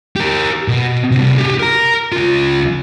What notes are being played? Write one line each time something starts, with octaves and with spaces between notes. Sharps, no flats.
G4 A#4
B2
C3 D4
G4 G#4
A#4 A#5
C#2 F4